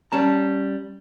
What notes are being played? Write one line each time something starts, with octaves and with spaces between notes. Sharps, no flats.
G3 C#4 A5 A#5